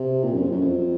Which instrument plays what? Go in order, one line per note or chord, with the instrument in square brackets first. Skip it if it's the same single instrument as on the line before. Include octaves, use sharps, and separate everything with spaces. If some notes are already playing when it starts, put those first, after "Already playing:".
Already playing: [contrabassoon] C3
A#2
F#2
F2
F#2
F2